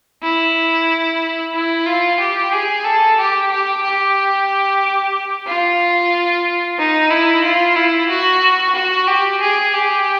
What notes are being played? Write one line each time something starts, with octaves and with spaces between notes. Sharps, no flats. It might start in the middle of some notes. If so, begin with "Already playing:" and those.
E4
E4
F4
G4
G#4
A4
G4
G4
G4
F4
D#4
E4
F4
E4
F#4
F#4
G4
G#4
G4